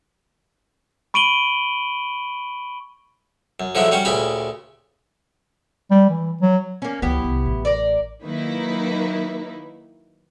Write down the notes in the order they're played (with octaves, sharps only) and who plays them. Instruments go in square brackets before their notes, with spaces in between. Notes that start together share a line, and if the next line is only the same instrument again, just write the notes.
[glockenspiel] B5 C#6 D7 D#7 F#7 G7
[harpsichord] F#2
D3 F3 F#3 G#3 A3 E4
G3 C#4 F#4 G4
D2 A#2 C#3 G4 G#5 B5
[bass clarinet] G3
E3
F#3
[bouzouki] A#3 C#4
[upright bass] C#2 F#3 [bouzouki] B3 E4 G4
[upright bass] C2
A1
[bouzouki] A#4 D5
[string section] D#3 F#3 A#3 D#4 E4 B4